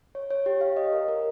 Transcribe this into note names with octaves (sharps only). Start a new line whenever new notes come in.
C#5
C#5
G4
F5
D#5
A#4
A#4